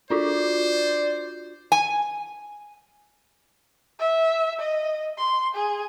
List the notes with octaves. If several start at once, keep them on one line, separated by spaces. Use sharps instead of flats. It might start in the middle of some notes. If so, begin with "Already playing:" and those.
D4 F4 F#4 C5 D5
G#5
E5
D#5
C6
G#4